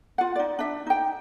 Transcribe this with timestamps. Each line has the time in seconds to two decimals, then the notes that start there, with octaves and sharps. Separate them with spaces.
0.18 F4 F#5
0.36 D#4 D5
0.59 D4 E5
0.87 D#4 G5